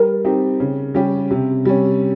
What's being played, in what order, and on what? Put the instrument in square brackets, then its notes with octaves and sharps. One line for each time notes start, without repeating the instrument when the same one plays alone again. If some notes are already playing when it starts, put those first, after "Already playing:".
Already playing: [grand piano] G3 [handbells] A#4
[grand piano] C4 D#4 G4
C#3
G3 C#4 G4
C3
G3 C#4